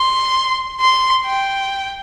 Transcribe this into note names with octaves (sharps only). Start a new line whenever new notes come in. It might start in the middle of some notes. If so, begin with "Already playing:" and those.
Already playing: C6
C6
G5